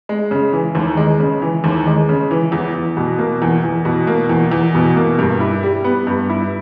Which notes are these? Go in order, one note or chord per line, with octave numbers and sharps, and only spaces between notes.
G#3
C#3
E3
D#2
G#3
C#3
E3
D#2
G#3
C#3
E3
E2
E2
B2
A#3
E2
E2
B2
A#3
E2
E2
B2
A#3
G2
E4
G3
B3
G2
E4